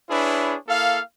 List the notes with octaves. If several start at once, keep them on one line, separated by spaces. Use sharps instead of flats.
D4 E4 G#4 B4 C#5
A#3 E4 A4 F5